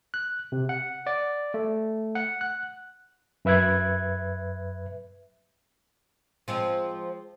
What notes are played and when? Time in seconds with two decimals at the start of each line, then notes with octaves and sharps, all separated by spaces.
0.14 F#6
0.52 C3
0.69 F#5
1.07 D5
1.54 A3
2.15 F#5
2.41 F#6
3.45 F#2 B4 E5 F#6 G#6
6.48 F3 G#3 C4